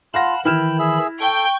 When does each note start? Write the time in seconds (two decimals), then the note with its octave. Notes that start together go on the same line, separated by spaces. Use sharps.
0.14 F4 F5 F#5 A5 B5 A#6
0.45 D#3 E3 E4 G5 B5 F6 E7
0.79 G#4 E5
1.21 A4 G5 C#6